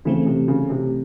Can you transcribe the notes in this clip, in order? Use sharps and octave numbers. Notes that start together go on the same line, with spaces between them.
C#3 E3 A3 C4
C3
C#3
C3